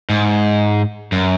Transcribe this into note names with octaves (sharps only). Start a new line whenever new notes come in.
G#2
F#2